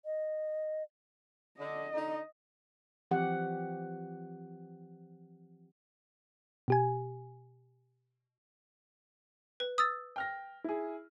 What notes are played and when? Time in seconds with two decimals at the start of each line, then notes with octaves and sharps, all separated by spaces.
0.05 D#5
1.59 D3 D#5
1.94 D3 D#4
3.11 E3 F3 C4 G4 F#5
6.68 B2 G4 G#5
9.60 B4
9.78 D#6 E6 A6
10.16 G5 F6 A#6
10.64 E4 G#4